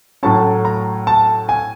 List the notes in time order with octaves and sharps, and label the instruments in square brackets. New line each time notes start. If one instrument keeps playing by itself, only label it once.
[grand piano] A2 F#3 A3 C#4 A5
A#5
A5
G#5